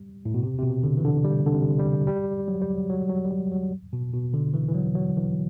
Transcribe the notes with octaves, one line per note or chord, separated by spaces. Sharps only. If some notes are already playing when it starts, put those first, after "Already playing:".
Already playing: G3
A2
B2
C3
C3
B2
D3
E3
D3
G3
D3
C3
G3
G3
F#3
G3
F#3
F#3
F#3
G3
F#3
F#3
B2
B2
D3
E3
E3
F#3
F#3
E3